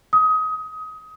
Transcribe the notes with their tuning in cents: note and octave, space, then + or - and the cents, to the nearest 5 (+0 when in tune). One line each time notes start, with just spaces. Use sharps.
D#6 +25